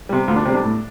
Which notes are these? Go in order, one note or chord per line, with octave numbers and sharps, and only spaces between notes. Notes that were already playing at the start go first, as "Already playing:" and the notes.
C3 G3
D2 F4
D4
C3 G3 C4
D4
A2